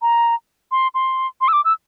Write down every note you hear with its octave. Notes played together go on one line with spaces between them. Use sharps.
A#5
C6
C6
C6
E6
D6
E6